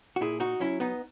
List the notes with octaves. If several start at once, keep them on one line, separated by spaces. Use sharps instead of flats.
F#4
A#2 E4 G#4
D#4 F#4
F#3 C#4 E4
B3 D#4